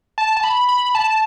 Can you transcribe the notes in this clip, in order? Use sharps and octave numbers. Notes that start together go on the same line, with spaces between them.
A5
A5
B5
B5
A5